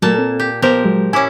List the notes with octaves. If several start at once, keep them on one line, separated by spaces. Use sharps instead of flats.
A#2 F#3 A3 A#3 A5
C4 A4
G4
F3 B3 G4 A#4 C5
F#3 G#3
C#4 E4 G#5 D6